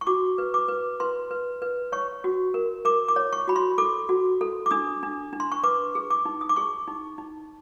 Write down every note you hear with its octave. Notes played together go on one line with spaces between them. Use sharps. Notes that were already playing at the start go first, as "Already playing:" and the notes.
C#6
F#4 D6
B4
D6
B4
B4 C6
B4
B4
C#5 C#6
F#4
A#4
A#4 D6
D6
C#5
C#6
F#4 B5
C6
A4 D6
F#4
A4
D6
D4 D#6
D4
D4
C6
C#6
B4 D6
G#4
D6
D#4
D#6
D6
G#4 C#6
D#4
D#4